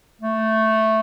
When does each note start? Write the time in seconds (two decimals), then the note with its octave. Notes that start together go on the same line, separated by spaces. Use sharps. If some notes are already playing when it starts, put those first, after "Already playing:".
0.22 A3